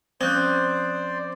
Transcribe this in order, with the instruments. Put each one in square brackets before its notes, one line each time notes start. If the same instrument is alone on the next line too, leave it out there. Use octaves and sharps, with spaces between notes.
[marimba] F3 C#4 [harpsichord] C4 [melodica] C5 D5 [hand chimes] D#6 F#6 G6